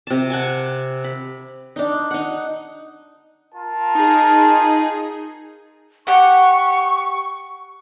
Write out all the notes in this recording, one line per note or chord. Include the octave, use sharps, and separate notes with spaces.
C3 A5
F#5 G#5 A5
B5
D4 D#4
D#4 F#5
F4 A#4 A5
D#4 G#4
G4 F#5 C#6